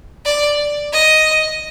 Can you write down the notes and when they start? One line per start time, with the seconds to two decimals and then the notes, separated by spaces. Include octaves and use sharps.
0.25 D5
0.93 D#5